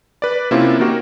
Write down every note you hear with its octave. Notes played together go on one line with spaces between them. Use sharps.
B4 D5
C3 A#3 C4 C#4 E4 F4
A#3 D#4 F#4 G4 A#4